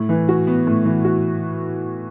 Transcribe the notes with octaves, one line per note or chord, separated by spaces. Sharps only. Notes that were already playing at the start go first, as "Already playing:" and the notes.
Already playing: A2
E3
F#4
B3
A2
E3
F#4